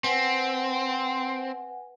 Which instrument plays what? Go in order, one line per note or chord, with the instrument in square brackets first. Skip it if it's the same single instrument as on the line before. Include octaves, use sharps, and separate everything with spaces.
[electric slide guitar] C4 [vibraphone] B4 F#5 G#5